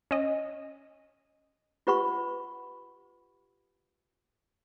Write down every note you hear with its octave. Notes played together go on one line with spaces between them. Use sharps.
C#4 D#5
F4 G4 B4 F#5 B5 C#6